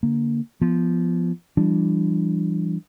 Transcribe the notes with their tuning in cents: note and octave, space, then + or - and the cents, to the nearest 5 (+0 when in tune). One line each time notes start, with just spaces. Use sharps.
D3 -20 A#3 +0
F3 -10 B3 +0
E3 +40 G3 +0 D4 +0